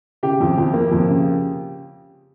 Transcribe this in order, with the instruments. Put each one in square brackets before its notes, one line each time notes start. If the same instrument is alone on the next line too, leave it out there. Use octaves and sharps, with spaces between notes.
[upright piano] C#3 G4
F2
F2
A#3
F2
C#3